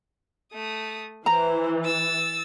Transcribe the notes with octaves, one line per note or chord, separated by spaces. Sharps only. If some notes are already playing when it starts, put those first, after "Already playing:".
A3 D#6
E3 C5 A#5
E6 A6